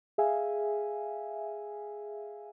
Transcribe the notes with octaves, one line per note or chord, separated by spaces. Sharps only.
G#4 E5 F5 G#5